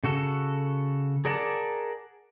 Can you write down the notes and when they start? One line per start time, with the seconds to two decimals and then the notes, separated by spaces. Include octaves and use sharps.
0.04 C#3 F#4 A4
1.25 G#4 A#4 D5 F#5 A5